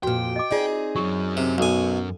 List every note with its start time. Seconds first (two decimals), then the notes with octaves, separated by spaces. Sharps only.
0.03 F2 A#2 F#4 B4 G5
0.36 D#5 D6
0.51 C4 D#4 F4 G#4 D5 D#5
0.96 F#2 F#3 F#5 C#6
1.37 C3
1.58 B1 A4 F#5 G#5